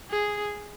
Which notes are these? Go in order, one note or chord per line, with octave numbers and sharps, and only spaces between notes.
G#4